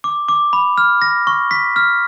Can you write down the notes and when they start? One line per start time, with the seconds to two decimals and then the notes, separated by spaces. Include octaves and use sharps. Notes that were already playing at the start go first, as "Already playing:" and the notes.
0.04 D6
0.29 D6
0.53 B5
0.78 F6
1.02 A#6
1.27 C#6
1.51 B6
1.76 F6